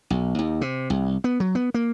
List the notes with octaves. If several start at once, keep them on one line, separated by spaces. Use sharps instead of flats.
B1
D#2
C3
C2
B3
F#3
B3
A#3